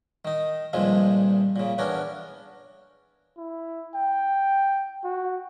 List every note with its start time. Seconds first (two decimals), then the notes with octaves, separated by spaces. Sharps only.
0.25 D#3 D#4
0.73 C2 G2 A#2 D#3 F3 G#3
1.56 A#2 C#3
1.78 E2 B3 C#4 D4 A#4
3.37 E4
3.95 G5
5.04 F#4